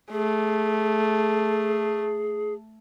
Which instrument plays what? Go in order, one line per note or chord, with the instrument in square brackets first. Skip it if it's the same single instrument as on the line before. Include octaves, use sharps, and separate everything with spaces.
[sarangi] A3 [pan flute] G#4